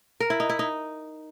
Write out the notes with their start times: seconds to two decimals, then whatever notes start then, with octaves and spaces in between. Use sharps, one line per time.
0.20 A#4
0.30 E4
0.40 D#4
0.49 E4
0.59 D#4